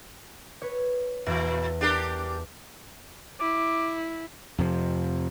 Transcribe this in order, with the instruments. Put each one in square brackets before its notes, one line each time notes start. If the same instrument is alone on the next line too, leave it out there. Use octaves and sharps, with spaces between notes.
[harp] B4 C#5
[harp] E2 [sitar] A#2
[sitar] D4 G4 A#4
[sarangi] E4 [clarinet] D6
[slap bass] F2 C3 F3